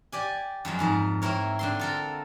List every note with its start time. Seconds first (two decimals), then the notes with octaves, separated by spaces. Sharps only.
0.12 G4 D5 G#5
0.65 F#2 F3 G#3
0.79 F2 G#2 A#4
1.22 C4 E4 A#4 C#5
1.59 D3 C4 C6
1.79 F4 A4 A#4